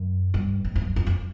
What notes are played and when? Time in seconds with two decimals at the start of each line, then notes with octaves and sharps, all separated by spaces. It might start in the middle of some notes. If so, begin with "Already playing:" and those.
Already playing: F#2
0.34 G2
0.65 G#2
0.75 F2
0.81 F#2
0.96 F2
1.07 F2